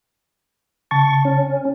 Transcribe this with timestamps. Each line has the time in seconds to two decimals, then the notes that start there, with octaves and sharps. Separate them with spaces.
0.91 C#3 A5 C#6 A6
1.25 C#4